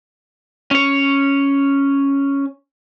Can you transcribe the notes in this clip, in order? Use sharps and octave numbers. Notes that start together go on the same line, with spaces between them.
C#4 C#5